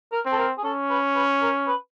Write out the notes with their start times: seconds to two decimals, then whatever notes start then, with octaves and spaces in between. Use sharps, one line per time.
0.12 A#4
0.25 C4
0.32 A4
0.38 A#4
0.58 G#4
0.64 C#4 A4
0.90 B4
1.15 B4
1.42 A#4
1.67 B4